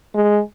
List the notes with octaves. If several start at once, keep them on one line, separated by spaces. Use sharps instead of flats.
G#3